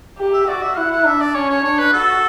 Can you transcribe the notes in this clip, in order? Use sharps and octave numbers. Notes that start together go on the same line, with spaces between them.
G4
E5
F#4 D5
E5
E4 F#5
F#5
D4 E5
D5
C#4 C#5
C#5
D4 C#5
B4
F#4 A4